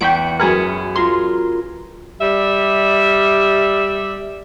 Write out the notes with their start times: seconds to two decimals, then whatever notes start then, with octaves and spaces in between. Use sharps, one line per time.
0.01 E2 F#5 G5 C#6 B6 D7
0.40 F#2 G#4 A#4 B4 G#5
0.96 F4 A#4 C6
2.21 G3 D5 E5